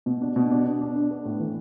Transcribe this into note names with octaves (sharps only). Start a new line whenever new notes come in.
B2
D4
B2
D4
D4
D4
D4
B3
A2
E3